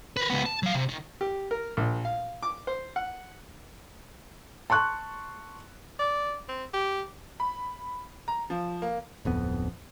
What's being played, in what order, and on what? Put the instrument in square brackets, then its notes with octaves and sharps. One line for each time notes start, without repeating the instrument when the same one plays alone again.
[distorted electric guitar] A#4 B4
C#2 B3
A5
F#3 F5
C3
D#3
[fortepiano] G4
A#4
A#1
F5
D6
C5
F#5
[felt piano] A5 C6 C#6 F#6
[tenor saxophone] D5
C4
G4
[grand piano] B5
A#5
F3
A#3
[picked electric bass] D1 F2 B3